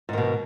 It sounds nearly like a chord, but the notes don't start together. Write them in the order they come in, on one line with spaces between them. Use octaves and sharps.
G#2 D#3 B2